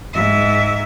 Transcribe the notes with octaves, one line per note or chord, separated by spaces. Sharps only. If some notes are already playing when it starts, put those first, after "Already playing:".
G#2 E5